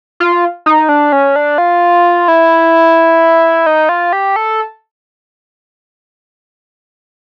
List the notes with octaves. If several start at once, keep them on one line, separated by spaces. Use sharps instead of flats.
F4
D#4
D4
C#4
D4
F4
E4
D#4
F4
G4
A4